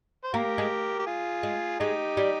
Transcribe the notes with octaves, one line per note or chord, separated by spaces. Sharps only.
C5
A#3 G4 A#4
G#3
G4
F4 G#4
G#3
G#3 D#4 G4
G3